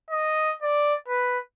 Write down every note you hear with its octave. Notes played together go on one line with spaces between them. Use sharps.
D#5
D5
B4